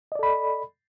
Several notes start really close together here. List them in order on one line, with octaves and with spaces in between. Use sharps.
D#5 D5 A4 B5